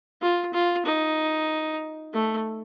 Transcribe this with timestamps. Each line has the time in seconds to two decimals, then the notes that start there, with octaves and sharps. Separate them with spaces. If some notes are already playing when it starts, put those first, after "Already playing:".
0.22 F4
0.53 F4
0.86 D#4
2.13 A3